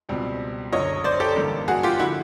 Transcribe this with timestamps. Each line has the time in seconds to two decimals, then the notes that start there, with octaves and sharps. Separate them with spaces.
0.09 C#2 B2 G3 C4
0.73 F#1 F#2 D3 C#5 D#5
1.04 C5 D5
1.20 G4 A4
1.36 A1 G2 D3 G3 A#3
1.68 F#4 G#4
1.83 F4 G4
1.99 D3 F3 E4 F#4